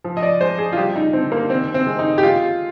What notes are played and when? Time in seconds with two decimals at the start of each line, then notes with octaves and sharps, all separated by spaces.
0.04 F3
0.17 D#5
0.23 D5
0.41 G#3 C5
0.58 G#4
0.73 F4
0.77 G3 G4
0.96 D#4
1.13 D3 C4
1.32 A#3
1.50 D#3 C4
1.74 C4
1.87 G#3
1.99 D#4
2.18 G4
2.23 G#3 F4